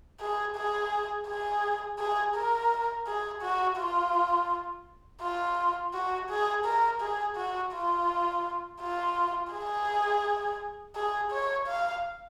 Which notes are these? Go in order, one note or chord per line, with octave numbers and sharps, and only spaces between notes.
G#4
G#4
G#4
G#4
A#4
G#4
F#4
F4
F4
F#4
G#4
A#4
G#4
F#4
F4
F4
G#4
G#4
C#5
F5